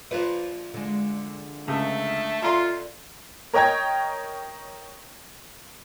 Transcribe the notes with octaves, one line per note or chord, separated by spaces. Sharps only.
A#1 A#2 F3 B4 C5
D3 G#3
C#2 A3
F2 D3 F4 E5 A#5 C6
A#4 C#5 D#5 G5 A#5 G#6